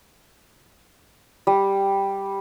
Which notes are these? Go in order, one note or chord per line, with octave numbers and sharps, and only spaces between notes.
G3